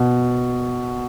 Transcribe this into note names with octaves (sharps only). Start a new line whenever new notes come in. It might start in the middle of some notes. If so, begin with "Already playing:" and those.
Already playing: B2